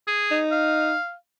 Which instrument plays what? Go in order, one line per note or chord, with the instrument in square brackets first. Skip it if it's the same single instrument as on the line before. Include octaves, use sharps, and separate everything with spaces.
[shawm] G#4
[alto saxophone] D#4
[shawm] F5